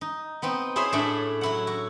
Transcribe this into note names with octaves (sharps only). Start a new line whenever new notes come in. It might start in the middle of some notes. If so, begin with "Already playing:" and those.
D#4
B3 C4 D#4
E4 G#4 C5 C#5 E5
A2 A3 C#4 D4 E4 G#4
F#3 E4 F#5
F#4